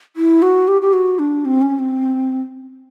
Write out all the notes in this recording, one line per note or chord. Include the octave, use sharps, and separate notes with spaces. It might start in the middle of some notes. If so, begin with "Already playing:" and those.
E4
F#4
G4
G4
F#4
D4
C4
C#4
C4